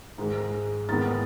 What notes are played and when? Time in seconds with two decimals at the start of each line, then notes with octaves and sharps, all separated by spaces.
0.18 G#2 D#3 G#3
0.89 G#2 D#3 G#3 B3 A6